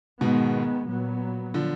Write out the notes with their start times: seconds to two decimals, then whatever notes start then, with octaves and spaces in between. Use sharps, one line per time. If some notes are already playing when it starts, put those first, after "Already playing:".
0.20 G#2 B2 D#3 G#3 B3
0.87 A#2 F#3 B3
1.54 D3 F3